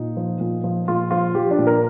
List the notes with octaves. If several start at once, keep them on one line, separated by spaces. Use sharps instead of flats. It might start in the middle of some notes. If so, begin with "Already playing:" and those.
Already playing: A#2 D#4
F3
A#2
F3
A#2 F4
F3 F4
F3 G4
D4
A#2
A#4